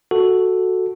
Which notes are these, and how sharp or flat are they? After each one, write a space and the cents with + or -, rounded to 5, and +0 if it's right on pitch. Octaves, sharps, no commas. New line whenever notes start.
F#4 +0 A4 +0